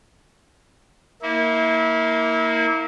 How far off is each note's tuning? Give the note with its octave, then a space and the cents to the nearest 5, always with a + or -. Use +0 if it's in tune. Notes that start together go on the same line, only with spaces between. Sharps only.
A#3 +0 E4 -30